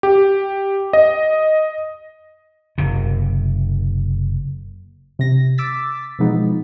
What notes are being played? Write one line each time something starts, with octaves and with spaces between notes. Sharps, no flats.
G4
D#5
F#1 C3
C3 A#6
D6 E6 A6 B6
B2 E3 F3 G#3 B3 D#4